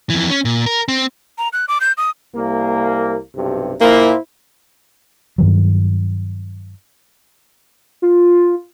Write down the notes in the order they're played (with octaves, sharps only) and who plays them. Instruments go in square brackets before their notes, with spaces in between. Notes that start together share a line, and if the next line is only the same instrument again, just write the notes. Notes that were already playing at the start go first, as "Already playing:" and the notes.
[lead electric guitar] F2 E3
C#4
A#2
A#4
C4
[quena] A#5
F#6
D6
G6
D#6
[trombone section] C2 A#3
B1 G2 C3
[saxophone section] A#2 A#3 [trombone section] E4 C5
[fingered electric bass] G2 D#3 F#3
[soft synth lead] F4